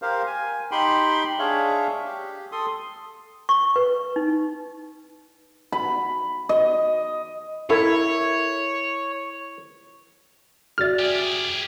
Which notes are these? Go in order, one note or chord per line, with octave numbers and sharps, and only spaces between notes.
G4 A#4 C5 F5
G#5
D#4 G4 G5 B5 C6
D4 G#4 C#5 E5 F5
G4
A4 C6 D#6
C#6
B4
D#4
B5
D#5
E4 A4 A#4 C#5
F#4 D5 E5 F6 A6
G4 G#4